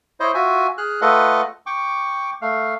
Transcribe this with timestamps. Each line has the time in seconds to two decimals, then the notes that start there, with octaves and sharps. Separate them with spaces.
0.20 E4 C5 C#5 D#5
0.34 F4 F#4 E5 G#5
0.78 G#4 F6 F#6
1.01 A3 F4 A4 B4 D#5 F#5
1.66 G5 C#6 D6
2.41 A3 F5